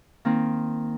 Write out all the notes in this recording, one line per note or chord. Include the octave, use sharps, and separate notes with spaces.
D#3 A#3 C4